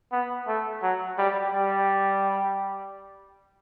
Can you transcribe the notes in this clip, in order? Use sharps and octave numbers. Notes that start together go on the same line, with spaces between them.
B3
A3
F#3
G3
G3